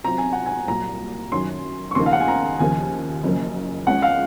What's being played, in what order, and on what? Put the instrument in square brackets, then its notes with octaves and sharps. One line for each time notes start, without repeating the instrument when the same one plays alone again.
[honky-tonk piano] C3 F#3 C4 F4 [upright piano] A#5
[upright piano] G#5
F#5
G#5
[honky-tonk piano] C2 A#2 F#3 [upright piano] A#5
[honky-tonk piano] F#2 D#3 F#3 C#4 [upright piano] C6
[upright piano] C#6
[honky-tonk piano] D#2 C#3 F3 A#3 D#4 [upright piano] C6
[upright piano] F5
F#5
G#5
A#5
[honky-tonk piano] D#2 C#3 F3 A#3 [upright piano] G#5
[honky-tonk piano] F#1 F#2 C#3 F3 A#3
[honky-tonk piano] C#2 C#3 G#3 C#4 [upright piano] F#5
[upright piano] F5